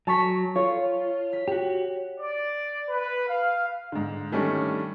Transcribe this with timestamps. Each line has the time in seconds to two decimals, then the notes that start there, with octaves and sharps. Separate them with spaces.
0.07 F#3 A5 C#6 B6
0.56 F4 C#5
1.33 B6
1.48 F#4 G4
2.19 D5
2.89 B4
3.26 F5
3.92 G#2 D3
4.32 D#3 G3 A3 C#4 D4